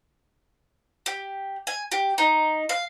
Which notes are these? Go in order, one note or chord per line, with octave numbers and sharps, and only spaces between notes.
G4
G#5
G4
D#4
F5